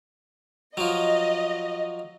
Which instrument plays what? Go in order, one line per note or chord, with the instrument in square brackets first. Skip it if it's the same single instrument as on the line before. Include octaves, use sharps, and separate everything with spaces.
[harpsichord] F3 F#3 [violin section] D#5